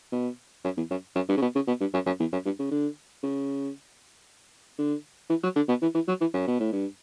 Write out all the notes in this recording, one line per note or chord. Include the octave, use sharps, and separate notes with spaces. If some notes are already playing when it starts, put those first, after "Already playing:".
B2
F#2
E2
F#2
F#2
G2
C#3
B2
C#3
B2
G2
F#2
F#2
E2
F#2
G2
C#3
D3
C#3
D3
E3
F#3
D3
B2
E3
E3
F#3
E3
F#2
B2
A2
G2